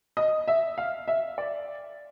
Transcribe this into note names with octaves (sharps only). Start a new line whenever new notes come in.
D#5
E5
F5
E5
D5